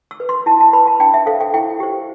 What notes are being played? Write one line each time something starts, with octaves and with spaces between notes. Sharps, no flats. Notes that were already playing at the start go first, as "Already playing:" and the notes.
E6
B4
C6
E4 A5
A5
B4 B5
A5
D4 G5
E5
A4 C5 F5
G5
E4 G5
G4 C5